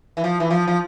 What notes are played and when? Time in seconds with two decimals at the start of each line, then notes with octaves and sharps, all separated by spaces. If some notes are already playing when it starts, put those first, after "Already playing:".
0.17 E3
0.24 F3
0.40 E3
0.50 F3
0.68 F3